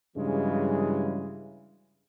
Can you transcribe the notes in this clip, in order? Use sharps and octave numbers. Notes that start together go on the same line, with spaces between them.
G2 C#3 E3 F#3 G#3